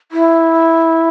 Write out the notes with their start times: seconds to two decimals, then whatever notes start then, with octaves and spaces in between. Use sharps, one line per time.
0.12 E4